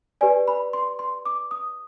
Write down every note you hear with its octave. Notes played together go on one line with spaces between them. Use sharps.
G4 B4 D5 G#5
B5
C6
C6
D6
D#6